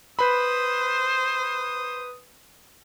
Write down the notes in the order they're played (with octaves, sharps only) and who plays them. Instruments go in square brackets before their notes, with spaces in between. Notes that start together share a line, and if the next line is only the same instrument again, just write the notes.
[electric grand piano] B4 B5 [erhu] C5 [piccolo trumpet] D#6